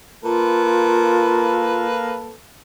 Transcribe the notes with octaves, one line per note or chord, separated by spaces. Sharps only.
A#3 F4 A4 B4